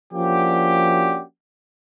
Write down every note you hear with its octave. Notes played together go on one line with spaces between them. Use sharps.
F3 A#3 C#4 D4 F#4 G4